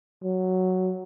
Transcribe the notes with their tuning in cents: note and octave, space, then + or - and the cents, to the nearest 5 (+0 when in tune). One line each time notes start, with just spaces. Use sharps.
F#3 +0